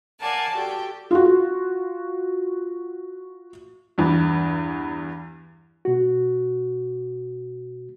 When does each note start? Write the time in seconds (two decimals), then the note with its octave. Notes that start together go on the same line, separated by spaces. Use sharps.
0.20 A#4 D5 F5 F#5 G#5 A5
0.55 F#4 G4 A4 D5 G5
1.11 F4 F#4
3.98 E2 G2
5.85 B2 F#4